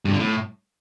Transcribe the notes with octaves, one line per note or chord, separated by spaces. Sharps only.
G2
D3
A2